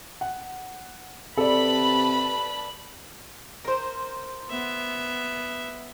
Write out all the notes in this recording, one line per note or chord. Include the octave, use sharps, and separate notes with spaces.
F#5
C3 A4 B4 D5 A5 B5
A#4 C5
B3 E5